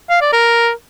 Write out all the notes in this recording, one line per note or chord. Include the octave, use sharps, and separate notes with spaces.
F5
D5
A#4